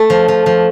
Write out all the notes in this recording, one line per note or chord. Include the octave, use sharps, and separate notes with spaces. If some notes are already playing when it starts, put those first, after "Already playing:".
Already playing: A3
F3
F3
F3